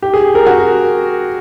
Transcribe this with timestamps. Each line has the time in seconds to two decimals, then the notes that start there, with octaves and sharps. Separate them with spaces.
0.02 G4
0.14 G#4
0.35 A#4
0.47 F#4